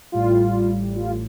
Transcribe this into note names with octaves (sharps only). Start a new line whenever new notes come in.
A1 A2 G3 F4
F4